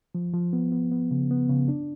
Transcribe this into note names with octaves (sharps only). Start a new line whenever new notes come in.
F3
F3
B3
B3
B3
C#3
B3
C#3
D4